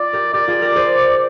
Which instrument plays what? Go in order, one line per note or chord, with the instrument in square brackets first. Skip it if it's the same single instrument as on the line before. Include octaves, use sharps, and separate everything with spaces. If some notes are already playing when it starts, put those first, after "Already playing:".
Already playing: [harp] F4 [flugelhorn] D5
[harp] G4 A#4
[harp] G4 A#4 [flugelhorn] D5
[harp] F4 G#4
G4 A#4
G#4 C5